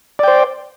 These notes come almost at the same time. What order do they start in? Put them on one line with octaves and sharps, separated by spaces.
D5 G5 C5